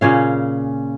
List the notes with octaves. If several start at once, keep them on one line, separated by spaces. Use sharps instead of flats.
A#2 C#3 C#4 F5